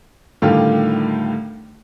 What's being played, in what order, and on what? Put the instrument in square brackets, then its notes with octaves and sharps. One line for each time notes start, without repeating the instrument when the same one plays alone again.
[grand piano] A2 D3 D#3 G3 F4